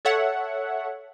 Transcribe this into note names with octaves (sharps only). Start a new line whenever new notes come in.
A4 C#5 E5 F#5